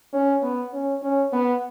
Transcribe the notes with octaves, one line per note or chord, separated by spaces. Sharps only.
C#4
B3
C#4
C#4
B3